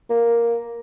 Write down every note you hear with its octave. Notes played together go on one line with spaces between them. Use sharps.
A#3